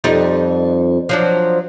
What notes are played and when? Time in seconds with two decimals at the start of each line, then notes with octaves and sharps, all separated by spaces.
0.04 F2 G3 D#4
1.09 F3 F#3 D4